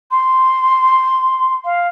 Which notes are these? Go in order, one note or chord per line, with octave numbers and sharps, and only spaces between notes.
C6
F5